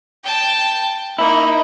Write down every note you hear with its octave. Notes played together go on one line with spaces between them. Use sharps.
G5 A5
A#3 D#4 E4